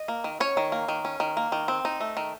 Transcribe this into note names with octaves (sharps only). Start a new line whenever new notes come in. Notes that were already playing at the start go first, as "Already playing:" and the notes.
Already playing: D#5
A#3
D#3
C#4 C#5
D#3
A#3
D#3
C#4
D#3
A#3
D#3
C4
D#4
A3
D#3